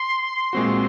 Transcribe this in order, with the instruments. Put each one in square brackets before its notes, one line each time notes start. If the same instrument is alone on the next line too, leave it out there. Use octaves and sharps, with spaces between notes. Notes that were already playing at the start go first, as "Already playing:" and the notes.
Already playing: [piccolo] C6
[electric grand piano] A#2 G#3 C4 F#4